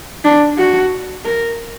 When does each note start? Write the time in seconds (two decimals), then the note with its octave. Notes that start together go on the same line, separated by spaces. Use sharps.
0.24 D4
0.58 F#4
1.25 A#4